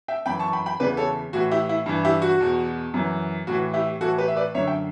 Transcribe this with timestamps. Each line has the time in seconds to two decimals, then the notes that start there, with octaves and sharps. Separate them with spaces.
0.08 E5 G5
0.26 F#2 E3 G5 B5
0.40 A5 C#6
0.53 G5 B5
0.66 G5 B5
0.80 E2 C#3 E3 B4 D5
0.97 A4 C#5
1.33 A2 E3 F#4
1.51 E4 G4
1.69 E4
1.86 G2 E3
2.05 E4 G4
2.22 F#4
2.40 E2 B2
2.94 F#2 E3
3.47 A2 E3 F#4
3.74 E4 G4
4.01 A2 E3 F#4 A4
4.18 G4 B4
4.28 E5
4.36 B4 D5
4.55 F#2 D3 C#5 E5
4.67 E5 G5